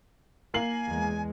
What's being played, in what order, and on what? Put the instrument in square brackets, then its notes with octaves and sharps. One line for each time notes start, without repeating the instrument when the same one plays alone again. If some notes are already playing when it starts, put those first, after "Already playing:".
[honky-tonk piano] A#3 C7 F#7 [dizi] G#5
[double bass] E2 G#3